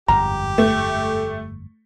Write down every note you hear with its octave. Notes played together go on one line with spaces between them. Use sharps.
G1 F2 G#2 G4 A#5
A3